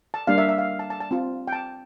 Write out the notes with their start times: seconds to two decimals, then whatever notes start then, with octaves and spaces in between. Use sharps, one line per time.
0.14 A5
0.27 G3 A#3 D4 F5
0.38 E5
0.49 E5
0.58 F5
0.79 A5
0.90 A5
1.00 A5
1.11 C4 F4
1.48 G5
1.53 A5